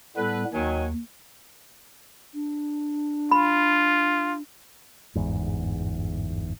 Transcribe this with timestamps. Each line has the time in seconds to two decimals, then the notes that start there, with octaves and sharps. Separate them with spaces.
0.17 A2 G3 B3 A4 B4
0.53 D#2 D#3 F#3 G#5
2.34 D4
3.31 F4 B5
5.15 G1 E2 G#2